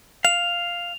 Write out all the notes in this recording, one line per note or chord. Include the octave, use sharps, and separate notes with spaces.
F5 F7